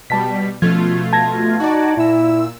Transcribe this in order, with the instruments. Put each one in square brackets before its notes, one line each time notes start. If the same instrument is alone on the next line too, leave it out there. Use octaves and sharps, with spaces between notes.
[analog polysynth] B2 G3 [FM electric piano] A5 B6
[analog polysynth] B2 A3 F4 [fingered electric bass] F3 C#4 [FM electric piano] G#6
[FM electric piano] A5 G#6 A#6
[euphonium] D#4 [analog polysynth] F#4 D5
[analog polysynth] A#2 E6 [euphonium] E4